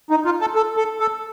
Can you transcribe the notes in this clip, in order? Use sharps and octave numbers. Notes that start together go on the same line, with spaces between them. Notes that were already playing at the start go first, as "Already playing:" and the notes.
D#4
F4
A4
A4
A4
A4